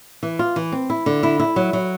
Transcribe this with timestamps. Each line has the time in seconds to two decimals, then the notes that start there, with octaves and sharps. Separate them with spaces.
0.23 E3
0.39 F4
0.56 E3
0.72 C4
0.90 E4
1.06 D3
1.23 E4
1.40 E4
1.56 F#3
1.73 F#3